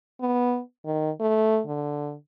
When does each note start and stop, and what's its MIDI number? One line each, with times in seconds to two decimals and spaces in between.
0.20 0.60 59
0.85 1.10 51
1.20 1.60 57
1.67 2.14 50